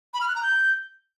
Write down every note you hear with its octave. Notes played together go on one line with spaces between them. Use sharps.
B5
F6
F#6
A#5
G6